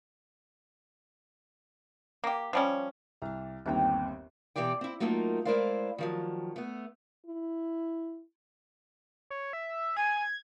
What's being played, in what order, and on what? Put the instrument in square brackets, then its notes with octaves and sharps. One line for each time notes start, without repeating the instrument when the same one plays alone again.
[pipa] A#3 G4
F3 G3 C#4
[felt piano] C2 [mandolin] D4 A#5
[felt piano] G1 D#2 C4 [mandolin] G5 A#5 D6
[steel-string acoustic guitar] B2 D#3 E3 G4 D5 G5
C4 E4
F#3 A3 A#3 D#4 F4 A#4
G#3 E4 A#4 C5 D5 F5
D#3 F3 F#3
A3 B3
[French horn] E4
[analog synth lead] C#5
E5
[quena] G#5 [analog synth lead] G#6